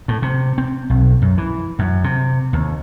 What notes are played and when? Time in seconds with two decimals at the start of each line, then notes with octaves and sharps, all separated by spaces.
0.08 A2
0.22 C3
0.58 C4
0.90 B1
1.22 F#2
1.38 E3
1.79 F#2
2.04 C3
2.53 D#2